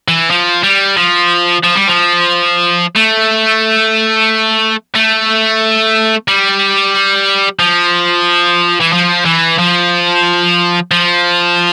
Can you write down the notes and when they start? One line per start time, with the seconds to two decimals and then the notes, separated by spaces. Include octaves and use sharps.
0.08 E3
0.30 F3
0.63 G3
0.97 F3
1.63 F3
1.75 G3
1.88 F3
2.96 A3
4.95 A3
6.28 G3
7.59 F3
8.80 E3
8.92 F3
9.25 E3
9.59 F3
10.91 F3